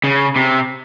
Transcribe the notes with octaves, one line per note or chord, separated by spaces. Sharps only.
C#3
C3